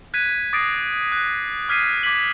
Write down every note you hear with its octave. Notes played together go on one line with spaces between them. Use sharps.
F#6 G#6 B6 D#7
D6 D#6 A6 A#6 C7 D7
F#6
D6 F6 G#6 B6 C7 D#7
D6 G#6 B6 F#7